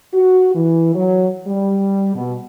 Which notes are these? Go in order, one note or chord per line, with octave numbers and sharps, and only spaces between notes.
F#4
E3
F#3
G3
B2